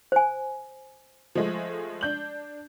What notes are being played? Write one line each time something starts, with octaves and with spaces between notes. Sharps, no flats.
C5 G#5
F3 G#3 A3
D4 G6 F#7